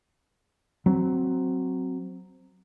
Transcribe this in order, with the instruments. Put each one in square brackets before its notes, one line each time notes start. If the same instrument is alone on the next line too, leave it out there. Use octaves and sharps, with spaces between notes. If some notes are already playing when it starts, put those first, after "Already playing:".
[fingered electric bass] F#3 C4